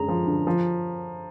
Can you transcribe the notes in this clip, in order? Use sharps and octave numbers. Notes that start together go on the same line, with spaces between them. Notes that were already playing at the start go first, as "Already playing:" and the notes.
Already playing: F#2 D3 G#3 A#5
F3
D3
F3